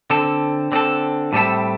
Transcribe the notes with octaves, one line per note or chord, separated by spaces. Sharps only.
D3 C4 A4
D3 C4 A4
A2 G3 C4 A4 E5